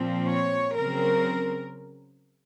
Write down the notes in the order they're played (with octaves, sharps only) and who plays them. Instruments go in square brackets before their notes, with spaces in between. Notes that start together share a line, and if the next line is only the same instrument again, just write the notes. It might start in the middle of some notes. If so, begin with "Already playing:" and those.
Already playing: [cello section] A#2 F3 C4
C#5
C#3 F#3 C4 A#4